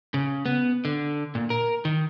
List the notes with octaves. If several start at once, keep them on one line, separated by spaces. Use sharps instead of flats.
C#3
B3
D3
A#2
A#4
D#3